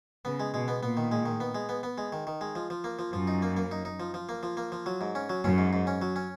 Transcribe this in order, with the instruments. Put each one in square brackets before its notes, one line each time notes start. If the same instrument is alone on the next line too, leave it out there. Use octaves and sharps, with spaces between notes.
[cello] C#3 [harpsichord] B3
[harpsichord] G#3
[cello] B2 [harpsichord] G#3
[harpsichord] B3
[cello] A#2 [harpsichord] B3
[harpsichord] D#3
G#3
D#3
B3
G#3
B3
B3
G#3
D#3
D#3
G#3
F3
F3
A#3
F3
[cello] F#2 [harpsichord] F3
[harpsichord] D#4
A#3
A#3
D#4
D#4
F3
F3
A#3
F3
A#3
F3
F#3
G#2
C#4
F#3
[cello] F#2 [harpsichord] C#4
[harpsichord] G#2
G#2
C#4
F#3
C#4